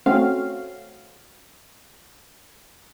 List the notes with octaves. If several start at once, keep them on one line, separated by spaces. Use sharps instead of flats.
A3 C4 C#4 F#4 F5